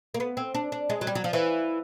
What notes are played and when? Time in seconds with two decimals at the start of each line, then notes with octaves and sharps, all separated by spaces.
0.14 A#3
0.20 B3
0.37 C4
0.54 D4
0.72 D4
0.90 G#3
1.01 F#3
1.07 G3
1.15 F#3
1.24 F3
1.33 E3